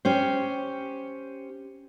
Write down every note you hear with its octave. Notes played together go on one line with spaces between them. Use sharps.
C#4 G4 C5